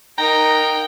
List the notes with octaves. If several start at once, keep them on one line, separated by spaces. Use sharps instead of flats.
D#4 A#4 G5 A#5